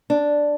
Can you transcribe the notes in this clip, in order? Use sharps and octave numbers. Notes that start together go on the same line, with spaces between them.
D4